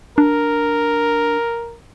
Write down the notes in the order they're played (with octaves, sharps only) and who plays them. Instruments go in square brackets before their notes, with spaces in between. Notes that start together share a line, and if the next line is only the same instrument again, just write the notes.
[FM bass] D4 [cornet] A#4